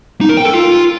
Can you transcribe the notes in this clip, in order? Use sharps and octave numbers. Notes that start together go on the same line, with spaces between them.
D#4
A#4
G5
A4
F4